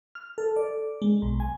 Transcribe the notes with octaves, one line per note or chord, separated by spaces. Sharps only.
F6
A4
D5
G#3
B1
G#5